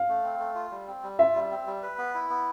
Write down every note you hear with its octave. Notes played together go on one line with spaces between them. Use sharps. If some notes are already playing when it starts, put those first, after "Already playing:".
Already playing: F5
A3
C4
A3
F4
G3
C4
G3
F4 E5
G3
C4
G3
B4
B3
E4
B3